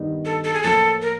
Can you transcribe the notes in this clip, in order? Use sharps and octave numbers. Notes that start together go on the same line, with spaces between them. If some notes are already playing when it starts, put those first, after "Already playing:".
Already playing: G2 D#3 G3 B3 D#4
A4
A4
G#4
A2 F3 A#3 A4
A#4